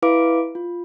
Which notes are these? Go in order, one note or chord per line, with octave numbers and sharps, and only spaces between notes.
E4 B4 F5 D6 D7
F4